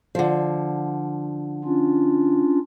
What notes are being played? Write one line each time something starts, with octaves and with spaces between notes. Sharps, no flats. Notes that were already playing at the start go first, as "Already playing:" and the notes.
D3 F3
C#4 D4 F4